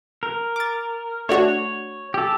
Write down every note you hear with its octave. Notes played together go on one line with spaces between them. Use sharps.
A#4
D6 A6
A3 D4 F#4 C#5
G4 A4